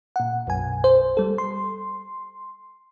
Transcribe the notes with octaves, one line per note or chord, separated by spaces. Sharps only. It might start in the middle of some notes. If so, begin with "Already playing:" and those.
A#2 F#5
B1 F#2 G#5
C5
G3 A4
C6